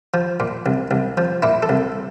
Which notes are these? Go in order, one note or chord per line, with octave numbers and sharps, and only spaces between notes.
F3
A#2
C2
C2
F3
A#2 E4
A4
C2